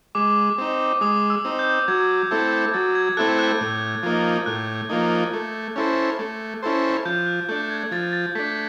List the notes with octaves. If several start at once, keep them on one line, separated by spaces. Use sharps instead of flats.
G#3 D6
C4 D#4
G#3 D#6
E6
C4 D#4
G6
F#3 G#6
A3 C4 E4 A4
F#3 A6
G#6
A3 C4 E4 A4 F#6
F#6
A2
F3 A#3 D#4
A2 F#6
F3 A#3 D#4
A3
C#4 E4 A4 C5
A3
C#4 E4 A4 C5
F3 G6
F#6
A3 D4 G6
G#6
F3 A6
A6
A3 D4 B6